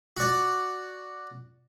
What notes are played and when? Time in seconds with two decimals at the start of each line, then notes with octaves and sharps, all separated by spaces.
0.17 F#4 D5